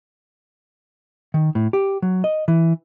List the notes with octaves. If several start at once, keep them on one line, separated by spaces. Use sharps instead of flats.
D#3
A2
G4
F#3
D#5
E3